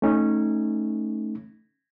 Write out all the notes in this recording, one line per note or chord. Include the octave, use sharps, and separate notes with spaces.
A3 C#4 D#4